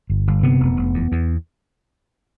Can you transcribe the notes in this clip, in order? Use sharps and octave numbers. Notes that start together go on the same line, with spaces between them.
G1
G1
C3 B3
F1
F1
E2
E2